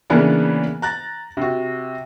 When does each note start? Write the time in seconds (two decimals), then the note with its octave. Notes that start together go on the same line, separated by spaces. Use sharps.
0.10 C#3 E3 A#3 B3 D4
0.82 A#5 F#6 A6
1.37 C3 F#4